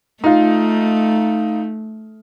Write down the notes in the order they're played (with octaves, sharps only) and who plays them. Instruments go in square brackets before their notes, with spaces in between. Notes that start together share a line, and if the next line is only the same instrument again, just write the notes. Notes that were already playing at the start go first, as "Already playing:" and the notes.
[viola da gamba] A3 [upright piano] D#4 F4